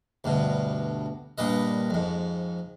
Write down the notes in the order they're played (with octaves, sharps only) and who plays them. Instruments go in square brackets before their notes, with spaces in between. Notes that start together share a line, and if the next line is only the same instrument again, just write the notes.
[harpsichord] D2 G2 B2
G2 A#2 B4 D#5
F2 G#2